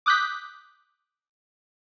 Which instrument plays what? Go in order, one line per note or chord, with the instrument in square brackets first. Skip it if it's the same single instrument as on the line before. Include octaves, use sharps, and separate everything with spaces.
[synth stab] D6 D#6 F#6 G6 B6